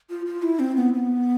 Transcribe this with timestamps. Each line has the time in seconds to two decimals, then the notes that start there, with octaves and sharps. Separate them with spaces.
0.10 F4
0.26 F4
0.43 E4
0.59 C4
0.76 B3
0.93 B3